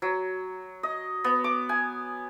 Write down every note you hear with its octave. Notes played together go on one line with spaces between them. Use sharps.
F#3
D#5
B3
D6
G#5